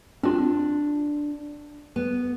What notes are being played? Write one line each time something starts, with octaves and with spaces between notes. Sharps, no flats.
C4 D4 F4
B3